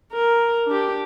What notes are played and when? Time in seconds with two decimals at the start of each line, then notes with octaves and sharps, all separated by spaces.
0.13 A#4
0.66 D4 G4